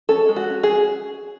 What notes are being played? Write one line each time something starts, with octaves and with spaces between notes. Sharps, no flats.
C#4 A4
G#3
F#4
C#4
G#4